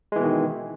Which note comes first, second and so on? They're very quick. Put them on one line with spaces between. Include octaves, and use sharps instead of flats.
G#3 E3 B2 D#3